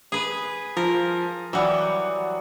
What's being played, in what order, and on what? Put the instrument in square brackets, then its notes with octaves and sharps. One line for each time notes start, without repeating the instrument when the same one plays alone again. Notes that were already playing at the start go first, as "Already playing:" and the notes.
[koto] G#4 B4
[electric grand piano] F3 [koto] A#4
[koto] E3 G3 [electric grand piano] F#3 F#5 D#6